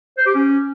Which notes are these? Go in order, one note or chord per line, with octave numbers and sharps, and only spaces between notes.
C5
G4
C#4